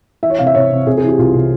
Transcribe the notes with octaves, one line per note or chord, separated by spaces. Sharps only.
E3 E5
C#5
C3 F5
E5
C3 C#5
C3
C3 G#4
G#4
E3 G4
C2 F4
C3